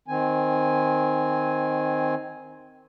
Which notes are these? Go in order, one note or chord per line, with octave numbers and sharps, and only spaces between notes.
D#3 C4 G#5